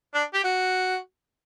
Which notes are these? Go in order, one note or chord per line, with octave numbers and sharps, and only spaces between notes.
D4
G4
F#4